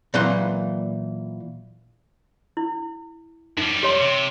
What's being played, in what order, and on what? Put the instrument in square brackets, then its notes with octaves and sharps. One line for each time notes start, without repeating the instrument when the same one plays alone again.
[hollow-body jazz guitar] A#2 E3 F#3 F5 F#5 C6
[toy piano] E4
[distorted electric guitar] F#2 G3 [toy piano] D#4
[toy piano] G4 C#5 C6
[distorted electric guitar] C3